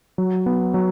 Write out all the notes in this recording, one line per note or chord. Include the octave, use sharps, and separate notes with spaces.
F#3
B3
F#3